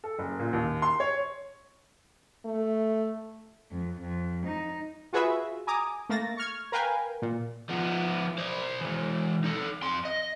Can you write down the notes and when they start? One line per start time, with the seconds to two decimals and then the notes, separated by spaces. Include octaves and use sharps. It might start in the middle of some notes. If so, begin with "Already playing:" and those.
0.04 A4
0.19 F#1
0.40 A#2
0.53 D#2
0.82 C6
1.00 C#5
2.45 A3
3.72 F2
4.01 F2
4.46 D#4
5.13 F4 F#4 G#4 B4 E5
5.67 G#5 A#5 D6 D#6
6.09 A3 A#3 A6 A#6
6.37 C#6 F6 G#6
6.72 A#4 B4 F5 G5 G#5
7.22 A#2
7.70 F3 B3
8.38 C5 D5
8.81 E3 G#3
9.44 D#4 A4
9.82 F2 C6
10.05 D#5